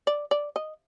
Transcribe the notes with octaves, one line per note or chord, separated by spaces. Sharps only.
D5
D5
D#5